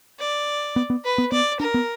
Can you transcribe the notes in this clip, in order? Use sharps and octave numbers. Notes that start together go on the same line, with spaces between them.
D5
B3
B3
B4
B3
B3 D5
D4 A#4
B3